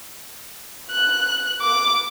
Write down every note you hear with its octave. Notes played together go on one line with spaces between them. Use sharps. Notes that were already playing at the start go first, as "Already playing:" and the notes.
F#6
D6